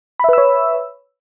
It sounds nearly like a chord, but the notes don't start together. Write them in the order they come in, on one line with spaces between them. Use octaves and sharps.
B5 E5 B4 E6 C#5